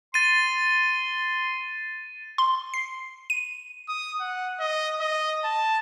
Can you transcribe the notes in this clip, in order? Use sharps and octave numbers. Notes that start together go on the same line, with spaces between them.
C6 A6 D#7
C6
C7
D#7
D#6
F#5
D#5
D#5
A5